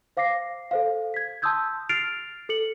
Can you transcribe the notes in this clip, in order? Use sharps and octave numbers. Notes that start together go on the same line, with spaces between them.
C5 F5 D6 A#6 C7
A4 C5 F5
G#6 B6
A5 C6 D#6 E6 G6 G#6
F6 A6 C7 D7 F7
A4 C#7 F#7